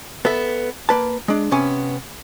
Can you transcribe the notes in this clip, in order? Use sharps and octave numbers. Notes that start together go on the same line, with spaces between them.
B3 A4 E5
A#3 B4 A5
G#3 D4
C3 B3 C#4 G#5